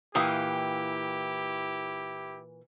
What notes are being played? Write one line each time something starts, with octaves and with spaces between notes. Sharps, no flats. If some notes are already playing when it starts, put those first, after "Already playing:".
A#2 E3 E4 G4 F5 G5 D#6